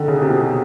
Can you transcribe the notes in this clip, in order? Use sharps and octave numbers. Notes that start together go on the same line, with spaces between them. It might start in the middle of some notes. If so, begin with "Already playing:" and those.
Already playing: D3 D#3
C#3
C3
B2